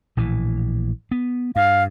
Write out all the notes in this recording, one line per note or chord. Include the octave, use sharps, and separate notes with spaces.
A#1 A2 E3
B3
G2 F5